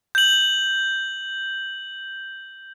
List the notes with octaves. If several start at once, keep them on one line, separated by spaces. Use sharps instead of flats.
G6 F#7